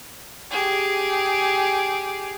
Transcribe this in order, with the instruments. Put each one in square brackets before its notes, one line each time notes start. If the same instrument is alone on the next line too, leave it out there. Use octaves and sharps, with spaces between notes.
[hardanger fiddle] G4 G#4